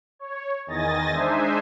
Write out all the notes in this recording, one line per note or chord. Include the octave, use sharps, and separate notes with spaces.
C#5
E2 D#3 D#5 G#5 A6 A#6
G#3 D4 D#4 C5 E5 G#5